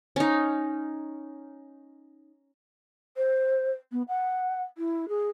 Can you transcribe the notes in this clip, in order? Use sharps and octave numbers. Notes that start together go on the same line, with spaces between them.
C#4 D#4
C5
B3
F#5
E4
G#4